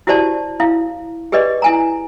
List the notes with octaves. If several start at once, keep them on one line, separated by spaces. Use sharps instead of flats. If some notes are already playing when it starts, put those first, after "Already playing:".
E4 F#4 G4 C5 D5 A5
E4 F5
G4 G#4 B4 D5 D#5
E4 G#5 A#5